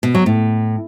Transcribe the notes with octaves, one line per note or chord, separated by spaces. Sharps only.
B2
F#3
A2